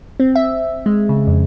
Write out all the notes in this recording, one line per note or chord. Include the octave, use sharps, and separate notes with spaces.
C4
E5
G#3
C#3
F2